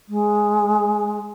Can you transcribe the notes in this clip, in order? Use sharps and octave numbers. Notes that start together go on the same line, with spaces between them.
G#3